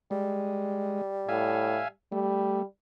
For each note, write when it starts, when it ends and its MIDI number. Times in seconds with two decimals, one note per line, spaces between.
0.11 1.91 55
0.11 1.02 56
1.29 1.80 45
1.29 1.88 76
1.29 1.88 77
1.29 1.88 80
2.12 2.63 55
2.12 2.62 57